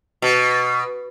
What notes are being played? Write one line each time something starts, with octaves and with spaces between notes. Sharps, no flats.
B2